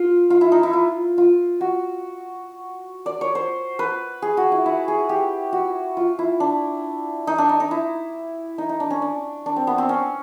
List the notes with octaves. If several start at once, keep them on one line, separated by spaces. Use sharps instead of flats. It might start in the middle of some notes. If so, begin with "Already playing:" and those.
Already playing: F4
F4
E4
D#4
E4
F4
F4
F#4
D5
C#5
C5
B4
G#4
F#4
E4
E4
G#4
G4
F#4
F4
E4
D4
D#4
D4
D#4
D#4
E4
D#4
D#4
D4
C#4
D4
D4
C4
B3
C4
C#4